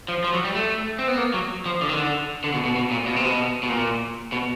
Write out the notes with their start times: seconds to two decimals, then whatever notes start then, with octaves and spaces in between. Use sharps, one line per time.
0.08 F3
0.24 F3
0.33 F#3
0.45 G3
0.55 A3
0.99 C4
1.08 B3
1.18 A#3
1.34 F#3
1.66 F3
1.81 D3
1.89 D#3
1.97 D3
2.44 D3
2.54 B2
2.65 B2
2.76 B2
2.91 A#2
3.06 B2
3.16 C3
3.25 B2
3.63 B2
3.69 A#2
4.32 B2